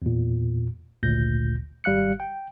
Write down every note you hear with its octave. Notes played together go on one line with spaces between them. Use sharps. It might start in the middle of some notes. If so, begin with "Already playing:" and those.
E2 A#2
G#1 D2 A#2 G6 A#6
G#1 G3 F5 F#6 C#7
G5